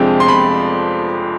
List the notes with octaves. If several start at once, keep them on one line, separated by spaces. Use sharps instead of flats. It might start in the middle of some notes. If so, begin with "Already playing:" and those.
Already playing: F2 C3 F3 G#3 D4 G5
C6
B5